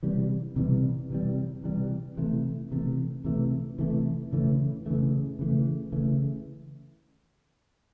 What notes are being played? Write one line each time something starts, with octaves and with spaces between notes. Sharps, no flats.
C3 E3 G3
C3 E3 G3
C3 E3 G3
C3 E3 G3
C3 E3 A3
C3 E3 A3
C3 E3 A3
C3 E3 A3
C#3 E3 A3
C#3 E3 A3
C#3 E3 A3
C#3 E3 A3